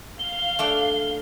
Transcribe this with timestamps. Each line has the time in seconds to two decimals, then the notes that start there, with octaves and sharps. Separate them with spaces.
0.19 F5 G7
0.59 A3 D4 G5